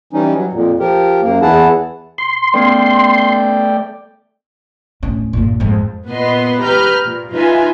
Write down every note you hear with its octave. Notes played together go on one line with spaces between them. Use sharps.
E3 G3 C#4 D#4
F#3
F2 A#2
F3 G4 A#4
F#2 A#3
E2 E3 E4 G#4 F#5 A5
C6
A3 B3 C#4 B4 D5 G5
D1 C#4
G2 A#2
F2 G#2
A#2 B3 B4 D#5 C6
G4 B4 A#5 F6 G6
A#2
D#4 F4 B4 E5 G#5